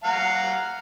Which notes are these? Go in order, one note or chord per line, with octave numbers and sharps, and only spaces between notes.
F5 F#5 A#5